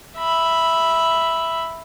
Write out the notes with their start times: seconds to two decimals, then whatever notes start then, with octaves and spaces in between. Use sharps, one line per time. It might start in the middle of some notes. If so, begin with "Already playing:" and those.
0.18 E5 B5